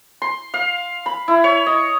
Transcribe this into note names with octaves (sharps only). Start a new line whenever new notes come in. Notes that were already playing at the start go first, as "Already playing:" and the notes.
C6
F5
B5
E4
C#5
D#5